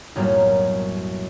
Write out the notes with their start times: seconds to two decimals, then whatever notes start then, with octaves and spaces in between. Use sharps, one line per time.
0.16 B1 F#2 A2 G3 A#3